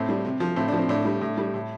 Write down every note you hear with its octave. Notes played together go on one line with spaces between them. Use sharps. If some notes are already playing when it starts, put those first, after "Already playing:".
Already playing: A2 C4
G3
C3
F3
A2 C4
D4
F3
C4
A2 D4
G3
A2
G3
A2